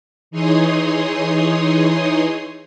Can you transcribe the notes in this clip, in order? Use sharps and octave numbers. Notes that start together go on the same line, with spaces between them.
E3 D#4 G#4 C#5 C6 D#6